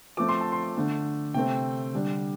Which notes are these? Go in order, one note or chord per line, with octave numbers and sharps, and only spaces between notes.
F3 A3 C4 D6
C6
A5
C6
D3 A3 D4
C3 A3 C4 G5
D3 G3 D4